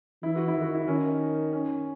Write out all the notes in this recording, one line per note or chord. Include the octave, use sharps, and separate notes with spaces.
E3 E4
F#4
E4
D#3
F#4
E4
D#3 C#4
C#4